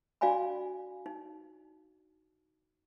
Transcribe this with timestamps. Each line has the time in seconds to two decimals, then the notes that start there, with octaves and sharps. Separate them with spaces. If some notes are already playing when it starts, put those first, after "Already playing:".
0.21 D4 F#4 D5 F5 G#5 B5
1.06 D#4